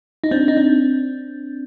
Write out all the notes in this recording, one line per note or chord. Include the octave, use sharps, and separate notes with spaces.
D#4
C4 D4
D#4
C4 D4